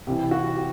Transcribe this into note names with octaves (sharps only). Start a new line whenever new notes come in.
C2 C3 E3 G4
F#4
G4